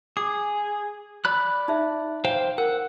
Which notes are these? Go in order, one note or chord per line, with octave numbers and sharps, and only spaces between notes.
G#4 D6
D5 B5 F#6
D#4 E5
C5 F5 G5
A#4 F#5